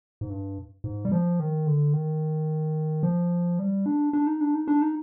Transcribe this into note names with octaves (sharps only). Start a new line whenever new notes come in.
G#2
G2
G#2
G3
F3
D#3
D3
D#3
F3
G3
D4
D4
D#4
D4
D#4
D4
D#4